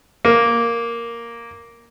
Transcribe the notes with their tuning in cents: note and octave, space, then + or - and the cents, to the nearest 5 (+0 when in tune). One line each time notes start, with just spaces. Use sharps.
A#3 +0